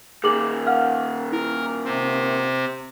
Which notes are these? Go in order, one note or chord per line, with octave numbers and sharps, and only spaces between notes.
A#2 D#3 G#4 D6 F#7
F5 F#5 F6
E4 A#4
C3 C4